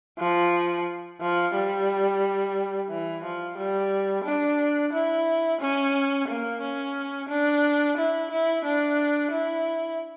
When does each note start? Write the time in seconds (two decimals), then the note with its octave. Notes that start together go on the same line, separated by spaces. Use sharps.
0.19 F3
1.21 F3
1.55 G3
2.89 E3
3.24 F3
3.57 G3
4.24 D4
4.93 E4
5.61 C#4
6.28 A#3
6.61 C#4
7.29 D4
7.97 E4
8.31 E4
8.65 D4
9.31 E4